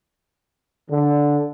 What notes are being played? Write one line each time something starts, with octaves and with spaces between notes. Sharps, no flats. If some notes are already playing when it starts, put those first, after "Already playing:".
D3